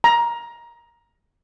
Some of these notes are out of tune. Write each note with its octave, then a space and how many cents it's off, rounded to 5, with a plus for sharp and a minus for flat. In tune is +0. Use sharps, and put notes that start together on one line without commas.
A#5 +20